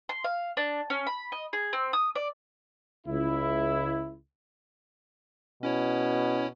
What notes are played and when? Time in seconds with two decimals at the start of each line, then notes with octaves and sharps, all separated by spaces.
0.09 C6
0.24 F5
0.57 D4
0.90 C#4
1.07 B5
1.32 D#5
1.53 G#4
1.73 C4
1.93 D#6
2.15 D5
3.06 C#2 E4
5.63 B2 C#4 E4 C#5